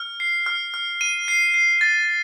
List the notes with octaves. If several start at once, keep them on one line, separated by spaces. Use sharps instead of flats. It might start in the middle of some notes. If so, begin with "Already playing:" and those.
Already playing: F6
C7
F6
F6
D#7
C7
C7
A6